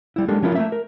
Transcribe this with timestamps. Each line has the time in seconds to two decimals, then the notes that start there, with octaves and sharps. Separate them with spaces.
0.16 G3 E4
0.28 G#3 A#3 D4 G4 A4
0.42 F3 C#4 E4 F4 A#4
0.55 A3 A#3 E5
0.72 A#4